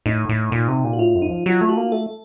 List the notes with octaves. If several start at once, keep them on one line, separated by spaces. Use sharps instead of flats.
A2 D#4
A2
A#2
C3
A#2
F#4
A2 F4
F#2
D#4
F3
F#3 F4
A3
F#4
A#3
A3 A4